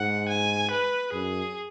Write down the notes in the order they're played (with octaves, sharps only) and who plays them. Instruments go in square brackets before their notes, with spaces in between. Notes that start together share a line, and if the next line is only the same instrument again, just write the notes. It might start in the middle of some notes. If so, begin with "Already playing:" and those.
Already playing: [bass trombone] G#2 [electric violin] F#5
[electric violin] G#5
B4
[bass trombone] F#2 [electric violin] G#4